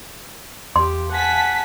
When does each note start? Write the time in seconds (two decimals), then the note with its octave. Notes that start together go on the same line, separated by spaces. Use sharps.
0.76 E2 G4 F5 C6
1.12 F#5 G#5 A5 B6